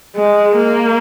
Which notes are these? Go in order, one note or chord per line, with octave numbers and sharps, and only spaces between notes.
G#3
A#3